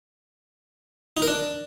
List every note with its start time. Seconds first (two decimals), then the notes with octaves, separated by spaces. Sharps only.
1.17 D#4
1.22 A#4
1.28 D4